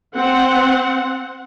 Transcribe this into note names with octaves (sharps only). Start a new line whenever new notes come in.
C4 F#5